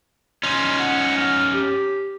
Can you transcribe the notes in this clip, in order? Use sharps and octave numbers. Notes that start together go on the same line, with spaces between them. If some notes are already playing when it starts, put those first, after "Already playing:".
C#4 D#4 C6
F#5
F6
G4